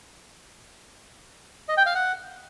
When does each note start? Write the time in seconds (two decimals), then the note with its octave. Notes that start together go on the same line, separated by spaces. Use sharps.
1.68 D#5
1.77 G5
1.86 F5
1.95 F#5